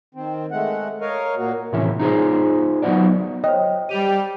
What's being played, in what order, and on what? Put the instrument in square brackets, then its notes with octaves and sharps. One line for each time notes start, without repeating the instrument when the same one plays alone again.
[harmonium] D#3 C4
G#3 A3 F#5
A#4 C#5 D#5 F5
A#2 A#3 F#4
[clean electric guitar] A2 C3 E3 F3 C#4 E4
D#4 F4 G#4 C5
F#3 B3 D#4 F4 F#4 D5
[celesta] C5 C#5 G5 [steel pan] D#5
[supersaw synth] G3 G4 [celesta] D#7 F7